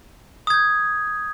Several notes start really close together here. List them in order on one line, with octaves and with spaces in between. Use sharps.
D#6 G#6 G6